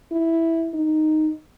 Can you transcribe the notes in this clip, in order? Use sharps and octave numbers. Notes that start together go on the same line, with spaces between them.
E4
D#4